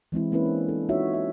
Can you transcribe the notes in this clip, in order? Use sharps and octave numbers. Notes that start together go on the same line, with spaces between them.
E3 G#3 C4 E4
A#3 C4 C#4 E4 B4
D4
D4 A4
D#4 F4 F#4 C#5 E5
E5